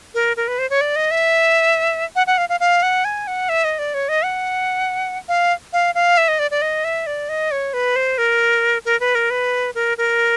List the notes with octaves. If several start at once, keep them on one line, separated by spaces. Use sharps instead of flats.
A#4
A#4
B4
C5
C#5
D5
D#5
E5
F#5
F#5
F5
F5
F5
F#5
G#5
F#5
E5
D#5
D5
C#5
D#5
F#5
F5
F5
F5
E5
D#5
D5
D5
D#5
E5
D5
D#5
C#5
B4
C5
A#4
A#4
B4
A#4
B4
A#4
A#4